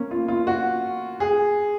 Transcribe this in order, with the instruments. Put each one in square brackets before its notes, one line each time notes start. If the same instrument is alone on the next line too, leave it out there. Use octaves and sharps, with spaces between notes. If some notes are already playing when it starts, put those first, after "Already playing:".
Already playing: [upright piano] A#3 C#4
F4
F4
F#4
G#4